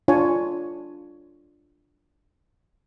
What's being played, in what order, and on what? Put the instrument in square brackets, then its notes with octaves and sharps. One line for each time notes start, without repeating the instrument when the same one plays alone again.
[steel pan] D4 F4 C#5 G#5 A5